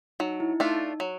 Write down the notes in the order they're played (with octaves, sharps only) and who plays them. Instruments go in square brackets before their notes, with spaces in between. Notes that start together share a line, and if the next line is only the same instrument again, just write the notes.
[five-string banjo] F#3 [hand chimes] D#4
[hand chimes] E4
[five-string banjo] A3 D4 F4 [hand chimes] D#4
[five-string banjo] F#3